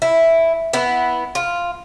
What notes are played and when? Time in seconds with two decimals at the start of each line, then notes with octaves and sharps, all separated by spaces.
0.02 E4
0.73 B3 E4
1.35 F4